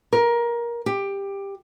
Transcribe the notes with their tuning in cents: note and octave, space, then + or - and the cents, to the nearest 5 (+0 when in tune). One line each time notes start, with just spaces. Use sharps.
A#4 +20
G4 +15